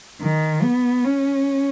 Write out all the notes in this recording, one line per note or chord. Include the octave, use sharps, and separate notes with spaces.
D#3
B3
C#4